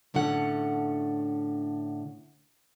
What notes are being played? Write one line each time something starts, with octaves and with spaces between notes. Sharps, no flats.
A2 D3 C#4 A4 F#5